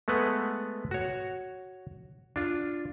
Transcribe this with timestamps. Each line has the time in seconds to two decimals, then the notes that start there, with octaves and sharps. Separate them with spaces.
0.08 G#3 A3 B3 B4 F#5
0.91 F#4 C#5
2.36 D4 F4